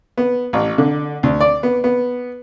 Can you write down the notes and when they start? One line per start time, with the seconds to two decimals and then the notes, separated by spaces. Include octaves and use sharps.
0.18 B3
0.53 A1
0.78 D3
1.23 D2
1.41 D5
1.63 B3
1.84 B3